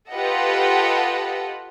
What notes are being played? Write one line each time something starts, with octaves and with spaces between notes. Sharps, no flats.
F4 G4 A4 B4 D#5 F#5